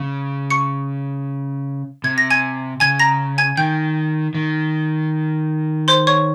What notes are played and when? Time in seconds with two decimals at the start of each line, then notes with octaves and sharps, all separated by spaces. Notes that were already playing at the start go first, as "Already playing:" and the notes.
Already playing: C#3
0.50 C#6 C#7
2.04 C3 G#6
2.18 A#6
2.30 G#5 G#6
2.80 C#3 G#5 G#6
3.00 A#5 A#6
3.38 G#5 G#6
3.57 D#3 G5 G6
4.35 D#3
5.88 C5 C6
6.07 C#5 C#6